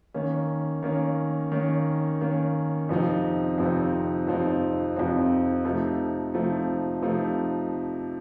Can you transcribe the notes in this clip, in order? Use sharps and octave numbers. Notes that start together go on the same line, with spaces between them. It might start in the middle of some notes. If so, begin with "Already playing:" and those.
D#3 A#3 C#4
D#3 A#3 C#4
D#3 A#3 C#4
D#3 A#3 C#4
F2 C3 F3 C4 D#4
F2 C3 F3 C4 D#4
F2 C3 F3 C4 D#4
F2 C3 F3 C4 D#4
C3 F3 A3 D#4
C3 F3 A3 D#4
C3 F3 A3 D#4